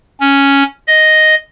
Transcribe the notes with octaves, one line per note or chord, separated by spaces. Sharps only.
C#4
D#5